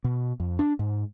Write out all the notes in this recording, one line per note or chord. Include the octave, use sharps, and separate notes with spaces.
B2
F2
D4
G#2